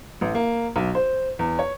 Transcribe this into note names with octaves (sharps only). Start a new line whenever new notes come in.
A1
A#3
B1
C5
E2
C#5